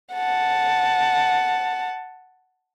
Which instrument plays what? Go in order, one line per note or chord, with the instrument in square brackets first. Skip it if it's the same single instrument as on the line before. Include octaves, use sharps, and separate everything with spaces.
[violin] F#5 A5